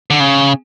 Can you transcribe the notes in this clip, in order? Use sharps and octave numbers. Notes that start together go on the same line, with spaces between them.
D3
C#3